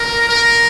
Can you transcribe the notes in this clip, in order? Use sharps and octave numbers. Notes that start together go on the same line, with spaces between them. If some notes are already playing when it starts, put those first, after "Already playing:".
Already playing: A#4
A#4